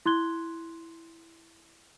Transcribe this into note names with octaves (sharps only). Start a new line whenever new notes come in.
E4 C6 F#6 G#6 G7